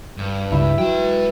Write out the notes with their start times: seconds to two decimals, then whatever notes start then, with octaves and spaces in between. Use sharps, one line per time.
0.18 G2
0.52 C#2 E4
0.78 F#3 B4 G5